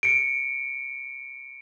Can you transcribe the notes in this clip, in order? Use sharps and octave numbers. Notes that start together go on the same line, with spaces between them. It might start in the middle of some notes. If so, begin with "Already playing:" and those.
C#7 D7